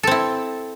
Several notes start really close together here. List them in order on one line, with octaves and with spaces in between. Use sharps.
A4 C4 E4